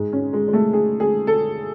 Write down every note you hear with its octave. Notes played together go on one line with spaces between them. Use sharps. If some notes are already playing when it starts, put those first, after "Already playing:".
Already playing: G#2 G#3
C#4
G#3
G#3
A3
G#4
G#4
A4